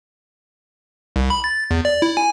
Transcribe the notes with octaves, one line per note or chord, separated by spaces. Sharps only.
C2
B5
A6
E2
D5
E4
G#5